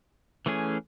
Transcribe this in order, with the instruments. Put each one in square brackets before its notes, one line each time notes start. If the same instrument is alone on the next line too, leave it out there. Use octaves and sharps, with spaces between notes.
[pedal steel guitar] E3 A3 C#4 G#4